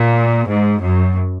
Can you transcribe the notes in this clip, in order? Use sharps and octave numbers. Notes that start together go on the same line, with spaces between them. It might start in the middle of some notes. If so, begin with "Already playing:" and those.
Already playing: A#2
G#2
F#2